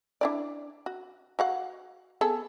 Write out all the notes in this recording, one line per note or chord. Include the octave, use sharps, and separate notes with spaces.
D4 E4 D5
F#4
F#4 F5 F#5
B3 G#4 A4